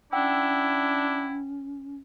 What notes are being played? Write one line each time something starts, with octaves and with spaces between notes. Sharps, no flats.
C#4 D4 E4 F#5 G5 E6